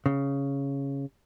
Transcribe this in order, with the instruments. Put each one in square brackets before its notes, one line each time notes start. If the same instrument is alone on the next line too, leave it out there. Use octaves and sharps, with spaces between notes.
[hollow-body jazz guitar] C#3